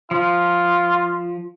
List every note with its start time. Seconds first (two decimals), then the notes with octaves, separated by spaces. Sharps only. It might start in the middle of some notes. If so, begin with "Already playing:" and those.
0.11 F3 F4